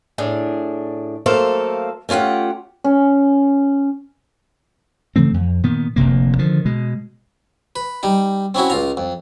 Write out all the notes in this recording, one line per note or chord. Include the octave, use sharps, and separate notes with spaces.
A2 D4 G#4
F#3 A3 A#3 A4 C5 F5
A3 C#4 F4 G4 F#5
C#4
C#3 E3 A3 C4
F2
A#2 D#3 B3
F1 D2 C3 A#3
D3 D#3 F3
B2 G#3
B4
G3 D#4
C4 C#4 E4 F#4
C#2 F4 A#5
F2